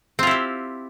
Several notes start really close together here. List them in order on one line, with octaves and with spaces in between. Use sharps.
C4 F4 E4 G4